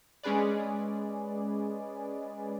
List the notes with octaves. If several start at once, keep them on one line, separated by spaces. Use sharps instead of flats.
G#3 C#4 G#4 B4 D5